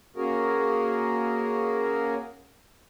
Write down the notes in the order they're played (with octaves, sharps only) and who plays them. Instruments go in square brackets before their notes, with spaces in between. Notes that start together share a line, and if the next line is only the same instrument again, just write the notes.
[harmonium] A#3 C#4 F#4 G#4 A#4